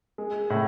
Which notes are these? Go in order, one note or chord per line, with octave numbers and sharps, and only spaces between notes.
G#3
A2